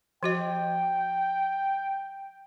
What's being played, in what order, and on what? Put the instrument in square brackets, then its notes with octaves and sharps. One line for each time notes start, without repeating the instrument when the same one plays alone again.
[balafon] F3 F#4 D#5 [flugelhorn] G5